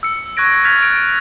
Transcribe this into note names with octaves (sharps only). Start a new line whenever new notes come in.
E6 C#7
C#6 F#6 G#6 A#6 D7
F6 F#6 G#6 A6 B6 F7
D7